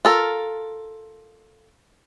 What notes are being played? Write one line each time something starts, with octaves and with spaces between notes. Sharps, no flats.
F4 A4 A#4